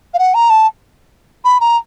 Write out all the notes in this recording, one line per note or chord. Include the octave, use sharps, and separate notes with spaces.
F5
F#5
A#5
A5
B5
A#5